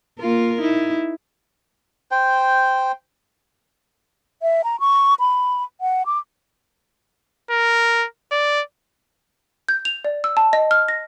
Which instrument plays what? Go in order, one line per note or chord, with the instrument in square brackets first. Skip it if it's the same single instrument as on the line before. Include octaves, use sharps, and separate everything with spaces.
[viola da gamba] A#3 F4 A#4
D#4 E4
[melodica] C5 G5
[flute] E5
A#5
C#6
B5
F#5
D6
[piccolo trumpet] A#4
D5
[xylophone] G6
F7
D5
E6
A5
D#5
F6
A#6